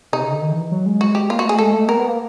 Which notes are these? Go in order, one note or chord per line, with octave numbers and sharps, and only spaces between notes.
C3 D#4
C#3
D3
D#3
E3
F#3
G#3
F#4
G4
A#3 F4
F#4
A3 G#4
G#3 A4
A3
B3 A#4
B3
A#3